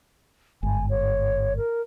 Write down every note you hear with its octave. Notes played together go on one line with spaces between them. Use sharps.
G1 G#2 G#5
C#5
A#4